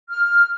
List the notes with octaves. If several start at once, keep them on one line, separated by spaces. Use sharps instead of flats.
F6